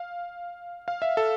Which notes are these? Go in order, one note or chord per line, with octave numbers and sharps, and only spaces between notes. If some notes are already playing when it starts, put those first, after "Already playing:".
Already playing: F5
F5
E5
A4